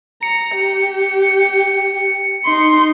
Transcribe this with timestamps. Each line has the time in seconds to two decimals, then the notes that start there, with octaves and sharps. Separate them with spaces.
0.23 A#5 C#7
0.56 G4
2.45 D#4 C6